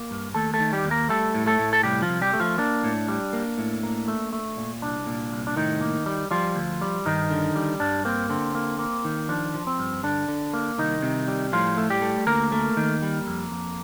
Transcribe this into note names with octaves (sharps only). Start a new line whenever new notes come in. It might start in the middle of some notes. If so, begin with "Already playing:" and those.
Already playing: A#3
G2
D#2 A3 A4
A3 A4
D#3
G3 G4
D#2
A#3 A#4
G3 A3 A4
A2
A3 A4
A2
A4
C2 G3 G4
F3 F4
C2
G3 G4
A3
F3 F4
A#3 D4
A2
G3
A#3
A2
A#3
A3
A3
A#2
C2 D4
A#2
C2
D4
A2 D#3 D#4
A#3
G3
F3 G3 F4
D2
G3
G2 D#3 D#4
D3
G3
G2 D4
A#3 C4
D3 C4
A#3
A#3
D#3
F3 D4
F3
C4
G2
D3 D4
D3
A#3
C2 D#3 D#4
C3
G3
A2 F3 F4
A3
G3 G4
A3
D2 A#3 A#4
A3
D#3
G3
F2
F2